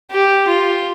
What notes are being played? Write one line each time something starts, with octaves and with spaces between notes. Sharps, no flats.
G4
F4